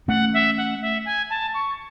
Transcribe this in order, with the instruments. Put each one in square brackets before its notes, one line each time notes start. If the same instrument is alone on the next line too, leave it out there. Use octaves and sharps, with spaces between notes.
[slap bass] A3 C#4 [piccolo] F#5
[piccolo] E5
F#5
E5
G#5
A5
C#6